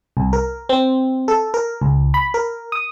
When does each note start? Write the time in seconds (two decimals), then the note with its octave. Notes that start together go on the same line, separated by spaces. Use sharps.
0.17 C2
0.33 A#4
0.69 C4
1.28 A4
1.54 A#4
1.82 C#2
2.14 B5
2.34 A#4
2.72 D#6